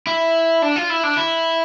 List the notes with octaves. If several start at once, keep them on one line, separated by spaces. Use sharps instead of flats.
E4
D4
F4
E4
D4
E4